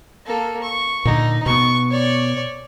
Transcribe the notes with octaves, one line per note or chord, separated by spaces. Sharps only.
A#3 A4
C#6
A#2 D3 D#4
B2 B3 C#6
C#5 D5